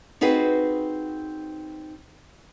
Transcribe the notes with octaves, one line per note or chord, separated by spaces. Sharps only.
C4 D#4 F#4 G#4 B4